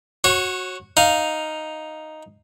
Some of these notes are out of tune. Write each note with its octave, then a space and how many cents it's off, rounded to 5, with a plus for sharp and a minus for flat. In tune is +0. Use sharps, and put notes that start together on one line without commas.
F#4 +0 C#5 -25
D#4 +0 F5 +0